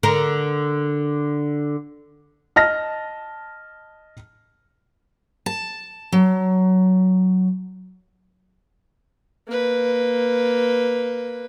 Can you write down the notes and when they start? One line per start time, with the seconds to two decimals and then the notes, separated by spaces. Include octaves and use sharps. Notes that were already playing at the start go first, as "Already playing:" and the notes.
0.03 D3 A#4
2.56 D#5 A5 F6 A#6
5.46 A5
6.12 F#3
9.47 A#3 B4